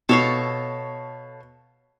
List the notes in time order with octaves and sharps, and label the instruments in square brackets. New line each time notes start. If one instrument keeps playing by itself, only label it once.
[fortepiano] B2 [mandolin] A4 C#5 F5